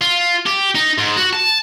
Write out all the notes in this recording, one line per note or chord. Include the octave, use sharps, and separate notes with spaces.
F4
G4
D#4
G#2
F#4
A5